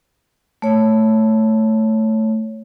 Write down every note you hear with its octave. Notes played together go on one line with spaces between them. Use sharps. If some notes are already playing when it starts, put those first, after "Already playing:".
A3 C#5